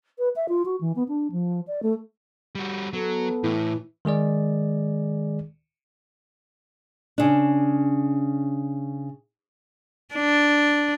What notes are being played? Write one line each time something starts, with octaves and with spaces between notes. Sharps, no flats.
B4
E5
F4
F#4
E3
B3
D4
F3
D5
A3
G3 F#4
F#3 B3 A4
A2 E3
D#3 G#3 G#4 D5
C#3 D4
D4